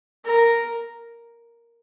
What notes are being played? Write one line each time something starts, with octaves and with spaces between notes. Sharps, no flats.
A#4